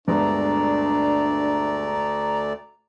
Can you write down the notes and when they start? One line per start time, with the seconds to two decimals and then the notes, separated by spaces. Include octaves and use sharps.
0.08 D2 G2 G#3 A3 B3 D4 D5 A#5